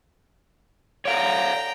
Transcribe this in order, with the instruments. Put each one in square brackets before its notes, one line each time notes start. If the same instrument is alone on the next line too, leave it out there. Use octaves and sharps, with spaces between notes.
[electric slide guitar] C#5 D5 F5 [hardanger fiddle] G5 A#5